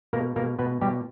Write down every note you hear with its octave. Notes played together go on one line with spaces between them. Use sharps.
B2 A#3 A#4
B2 A#3 A#4
B2 B3 B4
B2 G3 G4